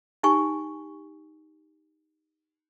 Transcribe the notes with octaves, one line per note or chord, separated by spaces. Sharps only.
D#4 G4 G#5 C#6